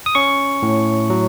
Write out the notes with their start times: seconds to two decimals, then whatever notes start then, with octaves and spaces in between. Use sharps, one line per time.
0.06 D#6
0.15 C#4 C#6
0.62 A2
1.10 F#3